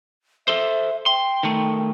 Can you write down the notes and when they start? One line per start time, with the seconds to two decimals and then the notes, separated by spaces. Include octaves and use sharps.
0.48 A4 C5 E5
1.06 G5 C6
1.43 D#3 A3